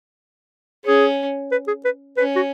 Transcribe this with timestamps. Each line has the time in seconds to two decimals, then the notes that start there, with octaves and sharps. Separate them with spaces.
0.85 C#4 G#4
1.52 B4
1.67 G#4
1.85 B4
2.17 C#4 B4
2.36 F#4